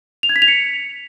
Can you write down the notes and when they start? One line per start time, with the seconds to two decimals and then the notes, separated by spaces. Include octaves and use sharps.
0.23 F7
0.29 G#6
0.36 B6
0.42 F7
0.48 C#7